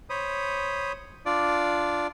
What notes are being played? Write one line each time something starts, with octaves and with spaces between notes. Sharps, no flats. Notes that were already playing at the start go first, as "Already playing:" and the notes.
C5 C#5 B5 D#6
D4 F4 D5